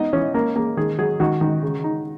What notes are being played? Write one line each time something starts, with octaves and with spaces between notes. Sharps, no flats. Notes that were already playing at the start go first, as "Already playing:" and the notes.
Already playing: B3 D#4 D#5
E3 C#4 C#5
A#3 C#4 A#4
A#3 G#4
D#3 G#4
F#3 G#4
D#3 F#4
D#3
C#3
D#4